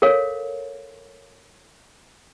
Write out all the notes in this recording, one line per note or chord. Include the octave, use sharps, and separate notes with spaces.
A4 A#4 C#5 F5